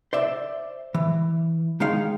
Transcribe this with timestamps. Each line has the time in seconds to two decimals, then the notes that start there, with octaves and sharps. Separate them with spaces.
0.13 C5 D5 E5
0.94 E3
1.80 D#3 G#3 D#4 F5